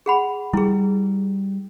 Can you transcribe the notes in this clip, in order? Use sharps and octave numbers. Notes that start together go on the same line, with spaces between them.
G#4 F#5 B5
G3 E4 G#4